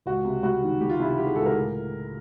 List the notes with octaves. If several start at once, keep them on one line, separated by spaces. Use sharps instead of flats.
C#2 F#4
C3
G3 F#4
D#3
G3 G4
F4
C3 E4
F4
D#3 G4
G#4
C#2 A4
A#4
A2